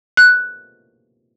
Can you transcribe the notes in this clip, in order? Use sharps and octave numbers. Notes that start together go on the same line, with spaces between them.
F#6